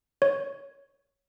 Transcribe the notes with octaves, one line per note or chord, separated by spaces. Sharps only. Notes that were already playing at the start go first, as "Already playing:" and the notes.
C#5